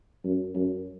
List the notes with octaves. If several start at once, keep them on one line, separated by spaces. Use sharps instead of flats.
F#2
F#2